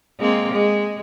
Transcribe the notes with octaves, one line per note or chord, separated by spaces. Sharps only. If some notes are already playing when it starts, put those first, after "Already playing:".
G#3 A#3 C4
G#3